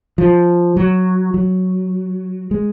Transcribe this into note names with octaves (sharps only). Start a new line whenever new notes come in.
F3
F#3
F#3
G#3